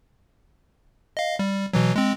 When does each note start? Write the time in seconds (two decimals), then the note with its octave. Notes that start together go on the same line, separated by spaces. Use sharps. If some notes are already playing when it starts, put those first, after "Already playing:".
1.17 D#5 F5
1.39 G3
1.73 B2 E3 F#3
1.96 G#3 C4